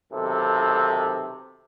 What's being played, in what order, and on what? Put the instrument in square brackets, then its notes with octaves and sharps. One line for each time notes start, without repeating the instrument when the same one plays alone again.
[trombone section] B1 C3 D#3 A4